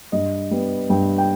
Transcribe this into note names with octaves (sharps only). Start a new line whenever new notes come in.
G2 D#5
G3 B3
G2 G5
G5